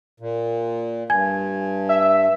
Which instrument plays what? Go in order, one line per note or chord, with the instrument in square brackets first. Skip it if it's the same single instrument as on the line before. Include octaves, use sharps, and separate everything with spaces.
[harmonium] A#2
[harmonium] G2 [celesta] G#5 G#6
[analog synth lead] E5